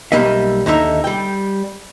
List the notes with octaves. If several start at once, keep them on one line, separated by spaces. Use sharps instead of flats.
B1 E3 G3 A#3 D#5 E5
D#2 D3 D#4 E5 A#5
G3 G5